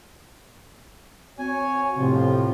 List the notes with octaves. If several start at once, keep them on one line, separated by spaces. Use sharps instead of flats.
C4 F#4 C#5 G#5
G1 F2 A2 C3 F3 F4